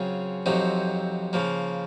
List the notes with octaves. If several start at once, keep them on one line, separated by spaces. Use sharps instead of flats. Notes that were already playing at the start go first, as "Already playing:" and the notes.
Already playing: C#3 F#3 C4 F4 G#4
F2 C3 F#3 C4 D#4
C#3 F3 A#3